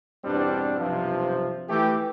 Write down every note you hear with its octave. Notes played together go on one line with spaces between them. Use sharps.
E2 G2 B2 G3 C4 D4
B1 G2 C3 F3
E3 A3 G4